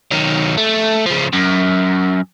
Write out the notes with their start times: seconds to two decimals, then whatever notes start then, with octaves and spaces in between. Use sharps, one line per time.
0.11 D#3 F#3
0.58 A3
1.06 C#3 F3
1.33 F#2